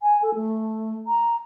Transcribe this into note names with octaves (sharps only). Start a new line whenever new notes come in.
G#5
A4
A3
A#5